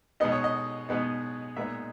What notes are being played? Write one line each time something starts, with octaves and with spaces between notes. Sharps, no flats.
B2 G#3 B3 D#4 D#5
C#5
D#5
B2 G#3 B3 D#4
A#2 G#3 B3 D#4 E5